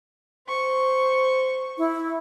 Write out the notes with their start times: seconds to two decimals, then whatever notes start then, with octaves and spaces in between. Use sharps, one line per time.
0.48 C5 C#6
1.78 E4